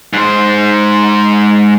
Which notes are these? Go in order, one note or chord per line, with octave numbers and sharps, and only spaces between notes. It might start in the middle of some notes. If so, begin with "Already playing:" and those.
G#2 C5